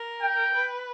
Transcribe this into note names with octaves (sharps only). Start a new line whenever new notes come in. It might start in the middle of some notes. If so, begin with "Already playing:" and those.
Already playing: A#4
G5
B4